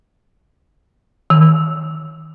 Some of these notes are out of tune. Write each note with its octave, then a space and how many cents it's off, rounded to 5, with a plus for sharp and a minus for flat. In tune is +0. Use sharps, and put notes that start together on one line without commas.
D#3 +30